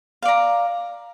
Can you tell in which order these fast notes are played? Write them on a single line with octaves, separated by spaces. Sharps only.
F5 D5 A#5